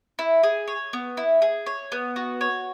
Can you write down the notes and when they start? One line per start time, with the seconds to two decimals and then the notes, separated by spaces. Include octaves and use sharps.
0.19 E4
0.43 G#4
0.68 C#5
0.93 B3
1.17 E4
1.42 G#4
1.66 C#5
1.92 B3
2.16 F#4
2.41 C#5